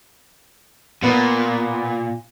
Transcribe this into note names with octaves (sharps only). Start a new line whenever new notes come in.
A#2 B3